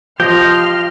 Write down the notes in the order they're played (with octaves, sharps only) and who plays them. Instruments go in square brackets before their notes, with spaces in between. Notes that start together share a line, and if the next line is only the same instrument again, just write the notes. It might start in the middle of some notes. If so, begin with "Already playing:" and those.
[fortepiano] F3 [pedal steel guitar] G4 D#5 [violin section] F5 C6 F6 [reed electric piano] G6